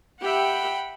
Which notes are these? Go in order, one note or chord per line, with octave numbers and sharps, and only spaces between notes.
G4 E5 F#5 G5 B5